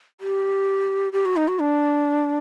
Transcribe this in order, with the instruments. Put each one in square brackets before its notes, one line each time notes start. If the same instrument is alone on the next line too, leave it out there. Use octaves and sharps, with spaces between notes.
[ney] G4
G4
F#4
D#4
F#4
D4